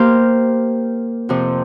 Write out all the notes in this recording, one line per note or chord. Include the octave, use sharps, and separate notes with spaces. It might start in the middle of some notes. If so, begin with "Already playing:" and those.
Already playing: A#3 G4 C5 F5
F2 C3 F3